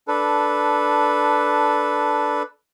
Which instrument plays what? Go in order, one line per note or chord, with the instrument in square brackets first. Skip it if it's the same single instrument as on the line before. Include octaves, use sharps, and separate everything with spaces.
[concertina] D4 A4 B4